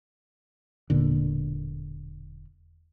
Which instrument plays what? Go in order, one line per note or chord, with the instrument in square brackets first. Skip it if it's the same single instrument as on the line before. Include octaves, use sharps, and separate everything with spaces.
[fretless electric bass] E1 A#2 D3